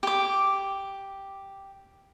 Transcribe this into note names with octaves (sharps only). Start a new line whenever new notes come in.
G4 D6